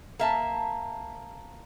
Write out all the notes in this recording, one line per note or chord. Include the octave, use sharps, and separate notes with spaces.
A#3 E5 A5